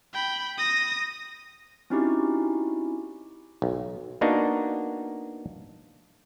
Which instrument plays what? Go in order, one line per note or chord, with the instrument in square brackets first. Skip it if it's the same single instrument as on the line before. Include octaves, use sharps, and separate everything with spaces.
[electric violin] G5 B5
D#6 A#6
[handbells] C4 C#4 D#4 E4 F#4 G4
[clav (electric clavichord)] B1
A#3 B3 D4 D#4 F#4